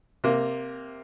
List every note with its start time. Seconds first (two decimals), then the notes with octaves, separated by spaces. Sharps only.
0.24 C3 A#3